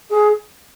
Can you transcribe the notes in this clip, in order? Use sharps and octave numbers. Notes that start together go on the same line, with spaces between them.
G#4